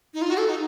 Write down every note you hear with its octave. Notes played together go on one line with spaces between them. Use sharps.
D#4
F4
F#4
A4
D#4